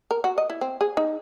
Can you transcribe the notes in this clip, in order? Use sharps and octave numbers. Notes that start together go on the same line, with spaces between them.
A#4
F#4
D#5
E4
C4
G#4
D#4